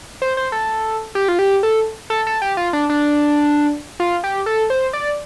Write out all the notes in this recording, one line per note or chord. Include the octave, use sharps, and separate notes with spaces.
C5
C5
A4
G4
F4
G4
A4
A4
A4
G4
F4
D4
D4
F4
G4
A4
C5
D5